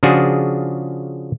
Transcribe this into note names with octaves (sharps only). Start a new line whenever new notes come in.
C#3 F3 D4 F4 F#4 G#4